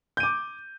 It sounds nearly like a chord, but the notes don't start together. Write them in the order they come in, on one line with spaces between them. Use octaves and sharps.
G6 D#7 D6